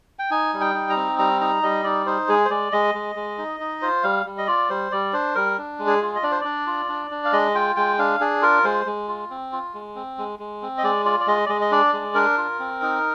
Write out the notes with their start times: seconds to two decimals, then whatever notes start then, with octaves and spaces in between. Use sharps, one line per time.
0.19 G5
0.31 D#4 G#5
0.54 G3
0.61 G5
0.74 D#4
0.90 A#5
0.96 C4
1.19 G3 A#5
1.41 D#4 A#5
1.63 G3 D#5
1.84 D#4 D5
2.06 D#4 C5
2.28 G#3 G#4
2.45 C5
2.50 G#3 D5
2.72 G#3 D#5
2.94 G#3
3.15 G#3
3.38 D#4
3.60 D#4
3.82 F4 C5
4.03 G3 F5
4.26 G3
4.38 D#5
4.47 F4 D5
4.70 G3 C5
4.92 G3 D5
5.13 D4 C5
5.35 G3 A#4
5.58 D4
5.79 G#3
5.87 G#4
6.02 F4
6.15 D#5
6.23 D4 D5
6.32 C5
6.41 D4 D5
6.67 F4
6.89 D4
7.11 D4
7.25 F5
7.33 G#3 D#5
7.55 F4 G5
7.76 G#3 G5
7.99 D4 F5
8.20 D4 G#4
8.42 F4 A#4
8.64 G#3 C5
8.86 G#3
9.08 F4
9.30 C4
9.52 F4
9.74 G#3
9.96 C4
10.18 G#3
10.39 G#3
10.62 C4
10.78 D#5
10.83 G#3 D5
11.05 F4 D5
11.20 D5
11.27 G#3 D#5
11.46 D5
11.49 G#3 D#5
11.61 D#5
11.71 D4 D5
11.93 G#3
12.15 D4 A#4
12.38 F4
12.59 C4
12.82 D#4